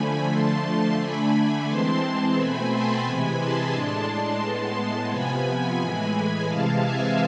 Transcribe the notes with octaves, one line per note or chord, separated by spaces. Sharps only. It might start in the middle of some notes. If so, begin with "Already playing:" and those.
Already playing: D3 F3 A3 G#5 B5
D3 F3 A3 A5 C6
D3 A3 D4 G#5 B5
E3 G#3 C4 A5 C6
B2 A3 C4 G#5 B5
A5 C6
C3 E3 G#3 G#5 B5
A5 C6
A2 G#3 D4 A5 C6
A5 C6
A2 G#3 B3
C3 F3 B3 G#5 B5
A2 E3 G#3
C3 E3 G#3 F5 A5
E5 G#5